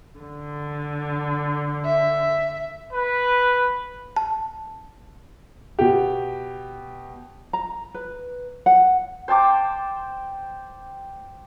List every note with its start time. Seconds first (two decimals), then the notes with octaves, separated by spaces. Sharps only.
0.18 D3
1.84 E5
2.93 B4
4.16 A5
5.79 B2 G4
7.53 A#5
7.94 B4
8.66 F#5
9.28 C5 G5 A5 D6